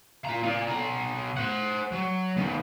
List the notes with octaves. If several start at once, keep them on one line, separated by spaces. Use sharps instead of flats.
F4 A#5
F4 D5
B2 A#5
C5 F#5
F#3
D#3 B3